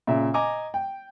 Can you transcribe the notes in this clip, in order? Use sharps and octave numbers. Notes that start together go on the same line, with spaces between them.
A#2 C#3 E5
D#5 G#5 A#5 D6
G5